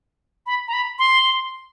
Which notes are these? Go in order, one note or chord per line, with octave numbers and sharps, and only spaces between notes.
B5
A#5
B5
C6